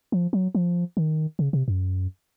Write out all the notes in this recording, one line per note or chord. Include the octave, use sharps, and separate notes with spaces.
F3
F#3
F3
D#3
C#3
C3
F#2